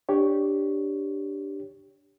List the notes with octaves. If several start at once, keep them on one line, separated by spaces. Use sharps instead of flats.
D4 G4 C#5